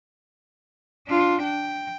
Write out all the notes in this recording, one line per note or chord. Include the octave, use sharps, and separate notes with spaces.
D4 F4
G5